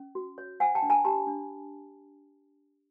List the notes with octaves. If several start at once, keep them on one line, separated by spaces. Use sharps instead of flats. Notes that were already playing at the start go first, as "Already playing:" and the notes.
Already playing: C#4
F#4
C#5
C5 F#5 G#5
G5 A5
D4
G#5 A#5
G4 A5 B5
D4